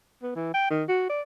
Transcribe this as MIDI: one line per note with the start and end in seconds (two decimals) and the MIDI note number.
0.23 0.35 59
0.36 0.52 52
0.54 0.66 79
0.70 0.83 51
0.89 1.06 66
1.09 1.21 74